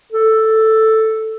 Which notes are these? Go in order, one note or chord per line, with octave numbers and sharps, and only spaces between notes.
A4